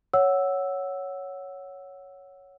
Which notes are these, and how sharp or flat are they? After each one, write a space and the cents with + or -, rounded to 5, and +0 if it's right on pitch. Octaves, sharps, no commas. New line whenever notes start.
C#5 +0 F#5 +0 E6 +0